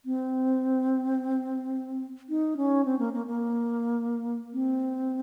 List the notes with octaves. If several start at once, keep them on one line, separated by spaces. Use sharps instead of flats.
C4
D#4
C#4
C4
A#3
A#3
A#3
C4